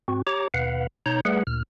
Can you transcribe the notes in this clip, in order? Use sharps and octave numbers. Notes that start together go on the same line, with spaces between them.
G#2 C4 F#4
G4 C#5 A#5 D6
D#2 B2 B4 F5 F#5
B2 D#4 C#5 A#5 G6
G3 A3 G#4 B4 F#5
D2 A#2 F6